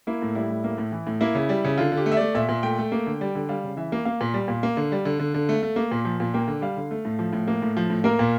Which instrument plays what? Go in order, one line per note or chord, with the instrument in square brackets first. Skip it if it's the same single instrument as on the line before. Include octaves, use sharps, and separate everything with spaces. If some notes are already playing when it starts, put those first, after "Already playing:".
[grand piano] A#3 E4
A2
G3 E4
A2
A#3
A2
E3
A2
A#3 E4
C#3
G3
C#3
D3 F4
D3
G4
A3
E5
A3 D5
A#2 E5
A#2
A3 G5
A3
A#3
D3
G3
D3
G3 F5
C#3
E3 E5
A#3
A#3 F5
A#2
G3
A#2
A#3
D3
G3
D3
D3
D3
A3
A3
A#3
A#2
F3
A#2
A#3 G5
D3
G3 F5
D3
A3
A2
F3
A2
A#3
A2
F3
A2
A#3 A#4
A#2